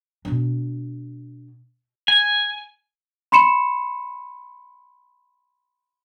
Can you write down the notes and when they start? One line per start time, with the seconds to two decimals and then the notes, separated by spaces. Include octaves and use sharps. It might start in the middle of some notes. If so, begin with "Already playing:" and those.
0.25 B2 D4
2.08 G#5
3.32 B5 C6 C#7 E7